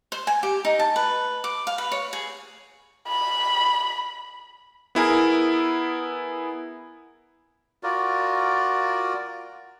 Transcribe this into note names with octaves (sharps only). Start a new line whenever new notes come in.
C5
G#5
G4
D#4
A5
B4
D6
F5
B4
C#5
G#4
B5
B3 E4 G#4 A#4
F4 F#4 A#4 D5